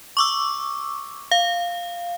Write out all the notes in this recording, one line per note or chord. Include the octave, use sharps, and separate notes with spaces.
C#6 D6 E6
F5